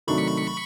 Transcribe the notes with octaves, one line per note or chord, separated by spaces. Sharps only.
C3 D#3 F#3 A3 D4 B5 C#6